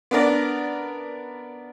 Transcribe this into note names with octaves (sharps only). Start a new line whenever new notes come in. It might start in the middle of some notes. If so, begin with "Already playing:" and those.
B3 D4 A#4 D5